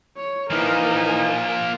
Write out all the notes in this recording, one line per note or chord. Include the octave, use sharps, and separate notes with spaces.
C#5
E3 F3 A#3 D#4 A#4 G#5